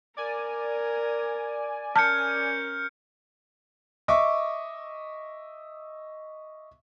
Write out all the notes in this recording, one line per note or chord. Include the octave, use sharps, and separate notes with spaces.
A#4 D5 G#5
C#4 A#4 A5 F6 G6 C#7
D#5 E5 C#6 D6